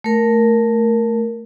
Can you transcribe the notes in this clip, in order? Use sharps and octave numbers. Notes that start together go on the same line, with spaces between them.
A3 A#4